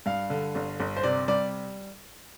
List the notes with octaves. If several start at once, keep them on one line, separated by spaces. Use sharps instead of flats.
G2 F5
D3
G1
G1
C5
C3 D5
G3 D5